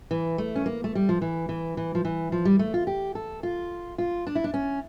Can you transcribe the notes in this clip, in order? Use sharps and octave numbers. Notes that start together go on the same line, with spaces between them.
E3
A3
C#4
A#3
A3
G3
F3
E3
E3
E3
F3
E3
F3
G3
A3
F4
G4
A4
F4
F4
D4
E4
D4
C#4